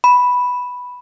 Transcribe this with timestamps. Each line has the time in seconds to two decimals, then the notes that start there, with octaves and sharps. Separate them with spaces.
0.04 B5